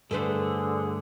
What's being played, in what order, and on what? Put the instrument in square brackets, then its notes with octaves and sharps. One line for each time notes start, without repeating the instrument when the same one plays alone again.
[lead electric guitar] G2 A3 [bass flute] D3 [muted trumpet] G#4 [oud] A4 B4 C5